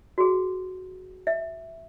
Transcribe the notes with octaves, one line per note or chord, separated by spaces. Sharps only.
F#4 G#4
E5